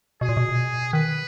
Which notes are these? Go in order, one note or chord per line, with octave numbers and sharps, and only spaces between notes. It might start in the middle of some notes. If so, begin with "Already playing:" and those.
B2 G#4
A#2
B2
D#3 B4